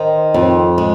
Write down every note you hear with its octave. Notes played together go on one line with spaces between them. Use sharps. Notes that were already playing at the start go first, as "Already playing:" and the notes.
Already playing: D#3 C5 D#5
F2
G#3